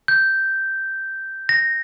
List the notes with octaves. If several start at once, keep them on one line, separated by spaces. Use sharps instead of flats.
G6
A#6